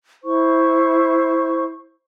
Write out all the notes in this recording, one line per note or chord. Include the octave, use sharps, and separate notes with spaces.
E4 C5 C#6